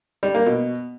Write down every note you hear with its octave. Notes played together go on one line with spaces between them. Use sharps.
G3
A#3
B2